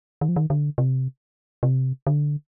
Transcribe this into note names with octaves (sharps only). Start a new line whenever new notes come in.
D#3
F3
D#3
D3
C3
C3
D3